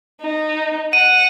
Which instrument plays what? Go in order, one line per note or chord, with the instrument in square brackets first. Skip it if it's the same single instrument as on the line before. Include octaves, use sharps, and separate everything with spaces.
[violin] D#4
[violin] F#5 [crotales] D#7